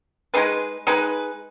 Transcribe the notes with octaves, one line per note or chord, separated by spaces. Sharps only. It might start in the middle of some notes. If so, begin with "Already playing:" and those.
G#3 D#4 G#4 B4
G#3 D#4 G#4 B4